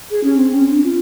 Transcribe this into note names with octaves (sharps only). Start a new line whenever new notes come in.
G#4
C#4
C4
C#4
D4
F4